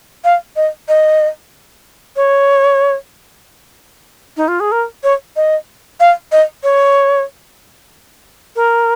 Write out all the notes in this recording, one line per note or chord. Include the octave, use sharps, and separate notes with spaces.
F5
D#5
D#5
C#5
D#4
F4
G#4
A#4
C#5
D#5
F5
D#5
C#5
A#4